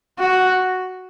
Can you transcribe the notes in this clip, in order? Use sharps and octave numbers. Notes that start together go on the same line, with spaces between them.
F#4